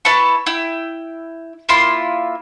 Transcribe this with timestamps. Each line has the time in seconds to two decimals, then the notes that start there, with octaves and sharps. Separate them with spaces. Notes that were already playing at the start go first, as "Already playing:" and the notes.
0.05 E4 B4 A5 C#6
0.46 E4 G5
1.69 A#3 E4 F4 C6